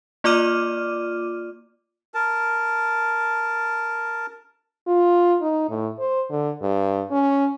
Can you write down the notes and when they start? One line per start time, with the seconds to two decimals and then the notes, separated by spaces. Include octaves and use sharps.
0.24 A#3 F4 D5 D6 F6 D#7
2.14 A#4 A5
4.87 F4
5.42 D#4
5.70 A2
5.99 C5
6.30 D3
6.62 G2
7.11 C#4